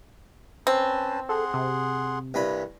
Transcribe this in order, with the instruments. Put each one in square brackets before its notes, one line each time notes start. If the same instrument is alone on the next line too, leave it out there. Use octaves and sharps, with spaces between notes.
[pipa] C4 [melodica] C#4 B4 A5
[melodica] G#4 F#5 C6 [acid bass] A4
[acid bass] C3
[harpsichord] C2 G2 B5